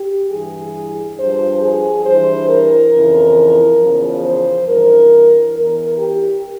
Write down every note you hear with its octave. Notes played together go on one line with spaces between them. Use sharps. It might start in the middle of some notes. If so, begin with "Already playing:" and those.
Already playing: G4
G2 E3 G#4
G2 F3 C5
G#4
G2 E3 C5
A#4
F2 C#3 E3
E2 C#3 F3
C5
G2 E3 A#4
E2 E3 A#4
G4